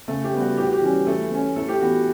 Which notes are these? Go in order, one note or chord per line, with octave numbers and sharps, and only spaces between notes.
C#3 A3 A4
G4
G3 B3
F#4
A2 G4
F#4
G4
E3 G3 C#4
E3 A3 A4
A3 C#4
A2 A3 A4
G4
E3 B3 F#4